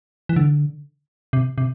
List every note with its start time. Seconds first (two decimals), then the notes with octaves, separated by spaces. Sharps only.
0.29 E3
0.36 D3
1.33 C3
1.58 C3